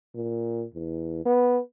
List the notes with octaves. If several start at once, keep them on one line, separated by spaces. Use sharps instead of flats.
A#2
E2
B3